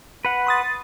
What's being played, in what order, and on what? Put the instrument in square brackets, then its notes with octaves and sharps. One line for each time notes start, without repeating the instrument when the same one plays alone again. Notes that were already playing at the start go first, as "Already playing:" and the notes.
[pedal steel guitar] B4 F#5
[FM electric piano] C6 D#6 A6